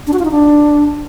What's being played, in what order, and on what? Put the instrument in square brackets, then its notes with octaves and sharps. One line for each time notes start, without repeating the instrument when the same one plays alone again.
[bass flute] D4
F#4
F4
D#4
D4